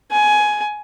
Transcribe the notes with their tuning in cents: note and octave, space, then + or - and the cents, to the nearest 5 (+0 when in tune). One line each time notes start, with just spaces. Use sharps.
G#5 +15